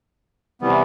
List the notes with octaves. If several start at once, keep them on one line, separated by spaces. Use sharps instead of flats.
C3 E3 G3 B3